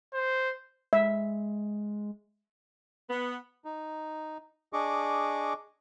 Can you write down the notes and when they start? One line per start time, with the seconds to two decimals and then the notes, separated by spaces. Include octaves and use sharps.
0.14 C5
0.93 G#3 E5
3.10 B3
3.65 D#4
4.73 D4 G#4 D#5 C#6 D6